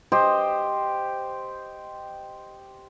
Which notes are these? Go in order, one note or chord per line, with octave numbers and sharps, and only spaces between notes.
G4 C5 D#5